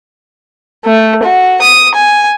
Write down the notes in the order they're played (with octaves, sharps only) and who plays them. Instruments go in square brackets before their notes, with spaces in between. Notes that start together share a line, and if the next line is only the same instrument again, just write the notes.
[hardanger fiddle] A3
F#4
D#6
G#5